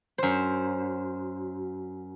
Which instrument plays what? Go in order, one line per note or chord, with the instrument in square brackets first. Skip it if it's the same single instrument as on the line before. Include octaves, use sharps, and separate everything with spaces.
[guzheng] F#2 C5